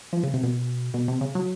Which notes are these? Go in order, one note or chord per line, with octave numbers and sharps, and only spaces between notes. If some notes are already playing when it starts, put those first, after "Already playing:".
F3
C#3
C3
B2
B2
C3
C#3
F#3